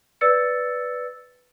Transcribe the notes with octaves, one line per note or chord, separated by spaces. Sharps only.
B4 D5 E6 A6 C#7